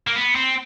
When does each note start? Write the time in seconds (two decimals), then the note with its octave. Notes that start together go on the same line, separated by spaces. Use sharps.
0.07 A#3
0.16 B3
0.35 C4